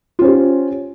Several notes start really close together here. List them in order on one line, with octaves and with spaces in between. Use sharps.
F4 C#4 C5 G4